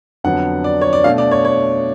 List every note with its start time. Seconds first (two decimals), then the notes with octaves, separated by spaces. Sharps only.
0.24 F2 D3 F#3 B3 F#5
0.64 D5
0.81 C#5
0.93 D5
1.04 B2 A3 D4 F5
1.18 D5
1.31 C#5
1.45 C#5